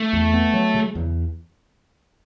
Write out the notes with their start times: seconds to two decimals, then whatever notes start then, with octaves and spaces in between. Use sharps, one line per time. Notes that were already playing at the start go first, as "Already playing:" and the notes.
Already playing: A3
0.13 E2
0.34 B3
0.54 F#3
0.74 C#3
0.95 E2